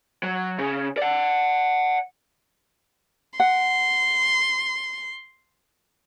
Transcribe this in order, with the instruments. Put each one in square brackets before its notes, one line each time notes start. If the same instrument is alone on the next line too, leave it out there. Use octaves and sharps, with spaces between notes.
[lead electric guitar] F#3
C#3
D5 F#5
[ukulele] F#5 [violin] C6